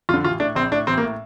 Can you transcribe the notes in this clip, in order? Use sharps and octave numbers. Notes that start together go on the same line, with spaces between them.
F2 D3 F4
A1 F4
A2 D4
A#1 C4
A2 D4
A1 C4
A#3
A2